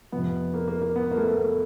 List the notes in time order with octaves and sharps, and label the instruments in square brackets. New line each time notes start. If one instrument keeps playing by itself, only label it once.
[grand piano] F2 C3 F3 B3
A#3
A#3
A#3
B3
A#3
A3
A#3
B3